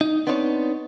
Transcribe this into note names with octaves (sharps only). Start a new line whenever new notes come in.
D#4
B3 C4 D4 D#4 C5 C#5